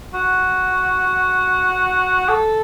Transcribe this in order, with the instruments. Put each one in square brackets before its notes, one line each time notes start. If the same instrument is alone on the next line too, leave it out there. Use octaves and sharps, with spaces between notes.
[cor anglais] F#4
A4